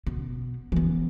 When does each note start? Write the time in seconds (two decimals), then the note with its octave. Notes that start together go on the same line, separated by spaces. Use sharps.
0.07 B2
0.72 E3 B3